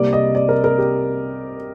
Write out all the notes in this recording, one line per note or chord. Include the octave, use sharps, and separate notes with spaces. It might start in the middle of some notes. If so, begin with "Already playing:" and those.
Already playing: C2 C3 G3 A#3 D5
D#5
D5
A#4
A#4
G4